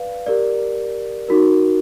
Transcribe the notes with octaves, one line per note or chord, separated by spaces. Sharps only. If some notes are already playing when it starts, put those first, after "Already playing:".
Already playing: B4 D5 F5
G4 A#4 D5
D#4 F#4 A#4